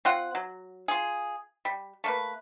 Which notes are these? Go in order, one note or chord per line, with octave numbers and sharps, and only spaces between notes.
C4 F4 F#5
F#3
F4 G#4
G3
A3 A#3 B4